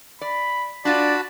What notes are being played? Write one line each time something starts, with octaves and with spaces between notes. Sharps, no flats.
D5 B5
D4 F4 F#4 D5 A5 B5